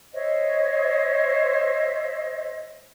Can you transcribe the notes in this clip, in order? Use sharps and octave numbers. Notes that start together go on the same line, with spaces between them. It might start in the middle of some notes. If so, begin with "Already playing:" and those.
C5 C#5 D#5 E5